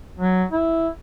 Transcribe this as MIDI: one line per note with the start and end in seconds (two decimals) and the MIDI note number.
0.18 0.44 54
0.51 0.88 64